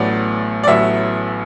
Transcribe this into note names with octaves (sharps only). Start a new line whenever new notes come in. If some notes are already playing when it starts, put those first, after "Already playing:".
Already playing: A1 A2 F#3 B3 D5
D5
A1 A2 F#3 B3 E5